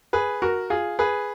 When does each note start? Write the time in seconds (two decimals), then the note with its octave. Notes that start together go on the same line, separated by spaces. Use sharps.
0.13 G#4 B4
0.42 F#4 A#4
0.70 F4 G#4
0.99 G#4 B4